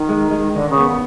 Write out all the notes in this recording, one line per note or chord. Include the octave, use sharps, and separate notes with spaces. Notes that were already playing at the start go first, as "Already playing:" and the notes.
Already playing: D#3
G#3
G#3
D3 D#3
C#3
B3